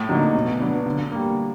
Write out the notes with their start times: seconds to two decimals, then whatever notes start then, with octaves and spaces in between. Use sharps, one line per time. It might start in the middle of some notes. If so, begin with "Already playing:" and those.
Already playing: A2
0.09 D3 F#3 A#3 D#4
0.34 B2
0.60 F#3 B3 D4
0.86 D3
1.12 G3 A#3